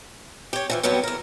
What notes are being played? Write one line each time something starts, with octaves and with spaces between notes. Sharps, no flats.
G4 C#5
D3 E3 F3
G2 F#3 G3 B3 C4
E2 A#4